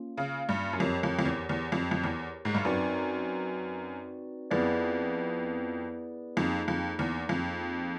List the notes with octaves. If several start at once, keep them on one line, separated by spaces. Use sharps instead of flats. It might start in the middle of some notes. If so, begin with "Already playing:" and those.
Already playing: A#3 C#4 F4
C#3
G2
F#2
F2 G4 A#4 C#5
F2
F2
E2
E2
F2
F2
E2
G#2
G2
F#2 C4 D#4 F#4 B4 D5
F2 B3 E4 G#4 B4 D5
F2 A#3 D#4 G#4
F2
E2
F2